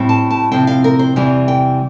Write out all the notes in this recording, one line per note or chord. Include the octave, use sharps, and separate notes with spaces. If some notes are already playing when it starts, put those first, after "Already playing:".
Already playing: A2 G3 C4 E4
A5
A5
C3 F3 C4 E4 G5
F5
A#4
C5
E2 C3 E3 G3
G5